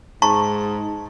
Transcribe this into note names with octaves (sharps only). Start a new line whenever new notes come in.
G#2 A5 A#5 C#6